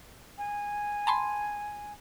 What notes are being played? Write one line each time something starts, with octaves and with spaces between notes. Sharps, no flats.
G#5
A5 B5 C6